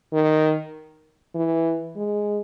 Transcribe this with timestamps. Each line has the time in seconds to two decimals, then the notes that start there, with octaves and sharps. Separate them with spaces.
0.13 D#3
1.35 E3
1.96 G#3